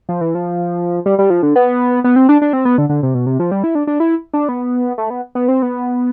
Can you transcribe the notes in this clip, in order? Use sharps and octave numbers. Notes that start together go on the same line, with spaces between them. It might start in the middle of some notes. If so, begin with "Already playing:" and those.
F3
E3
F3
G3
G3
F3
D3
B3
B3
C4
D4
D4
C4
B3
D3
D3
C3
B2
C3
F3
G3
E4
D4
D4
E4
D4
B3
A3
B3
B3
C4
B3